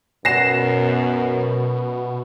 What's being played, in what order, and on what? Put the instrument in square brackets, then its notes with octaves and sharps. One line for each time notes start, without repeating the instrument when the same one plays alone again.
[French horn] F#2 [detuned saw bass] B2 [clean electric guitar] B3 [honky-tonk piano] A#6 C7 E7